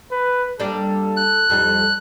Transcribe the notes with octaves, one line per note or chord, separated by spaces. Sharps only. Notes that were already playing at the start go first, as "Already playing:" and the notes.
B4
G3 A#3 D4 A4
F#6
F2 G3 D#4 A4